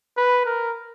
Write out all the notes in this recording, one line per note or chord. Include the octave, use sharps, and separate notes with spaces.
B4
A#4